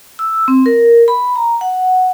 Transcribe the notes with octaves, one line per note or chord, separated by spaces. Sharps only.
E6
C4
A#4
B5
A#5
F#5